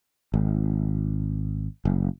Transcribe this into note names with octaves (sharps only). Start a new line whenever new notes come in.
G#1
F#1